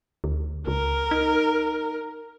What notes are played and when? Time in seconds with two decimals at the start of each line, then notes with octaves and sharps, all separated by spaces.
0.24 D2
0.67 C#2 A#4
1.11 D#4